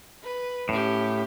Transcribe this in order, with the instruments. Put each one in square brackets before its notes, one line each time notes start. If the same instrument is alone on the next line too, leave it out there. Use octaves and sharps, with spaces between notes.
[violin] B4
[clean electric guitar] A2 [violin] C#4 G4